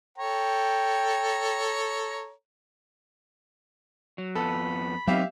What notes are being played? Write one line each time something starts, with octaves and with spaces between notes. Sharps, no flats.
A4 C#5 G5 A#5
F#3
F2 B3 A4 B5
F#3 B3 C4 D#4 G4 E5 F5